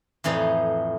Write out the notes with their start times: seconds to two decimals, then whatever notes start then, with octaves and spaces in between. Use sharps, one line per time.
0.24 F2 A2 E3 D#4 D5